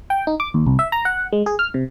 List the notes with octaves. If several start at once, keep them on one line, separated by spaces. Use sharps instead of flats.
G5
D#4
D6
D#2
C2
E5
A#5
F#5
G#3
G#4
F6
C3